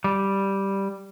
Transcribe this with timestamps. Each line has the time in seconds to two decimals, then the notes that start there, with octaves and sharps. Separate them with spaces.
0.04 G3